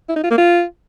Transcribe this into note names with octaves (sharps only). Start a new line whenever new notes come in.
E4
D#4
F4
A#3
F4